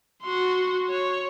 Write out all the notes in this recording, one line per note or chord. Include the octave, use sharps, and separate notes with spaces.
F#4 C6
C#5